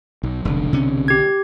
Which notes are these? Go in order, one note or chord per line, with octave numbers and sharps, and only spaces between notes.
B1
F1 B1 D3 D4
C3 C#4
G4 G#6